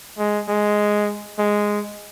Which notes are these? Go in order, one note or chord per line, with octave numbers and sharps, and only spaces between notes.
G#3
G#3
G#3